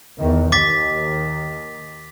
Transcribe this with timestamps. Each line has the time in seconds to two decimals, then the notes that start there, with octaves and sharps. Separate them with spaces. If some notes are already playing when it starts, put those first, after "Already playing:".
0.19 E2 D#3
0.52 D#2 D#3 D6 A6 B6